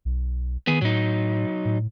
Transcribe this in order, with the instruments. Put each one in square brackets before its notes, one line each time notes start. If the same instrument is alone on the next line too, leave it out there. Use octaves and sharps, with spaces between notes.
[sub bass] B1
[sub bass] D#3 [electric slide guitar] B3 G#4
[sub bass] A2 [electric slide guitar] F#3 D#4
[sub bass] A2